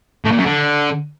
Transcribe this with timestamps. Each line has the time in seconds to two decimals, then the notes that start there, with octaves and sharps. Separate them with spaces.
0.25 A2
0.31 A#2
0.38 F#2
0.45 D3